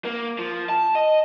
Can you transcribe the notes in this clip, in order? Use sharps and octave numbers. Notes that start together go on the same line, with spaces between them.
A#3
F3
A5
D#5